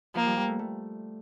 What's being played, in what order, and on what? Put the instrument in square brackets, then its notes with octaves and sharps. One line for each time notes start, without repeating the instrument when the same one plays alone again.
[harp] F3 [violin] A#3
[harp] G3
G3
A3
A3